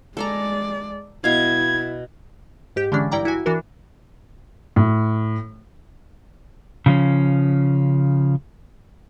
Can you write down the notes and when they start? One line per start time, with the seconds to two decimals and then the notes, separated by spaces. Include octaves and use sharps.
0.17 G#3 A4 D5 G#5 A#5
1.24 B2 E4 F5 G#6
2.76 G#2 G4 G6
2.92 D3 E3 G#3 C#4 D4
3.12 G2 E4 D5 G5 A#5 D6
3.25 E4 F#4 G#5
3.46 E3 D4 F#4 A#4
4.76 A2
6.86 C#3 F3 C#4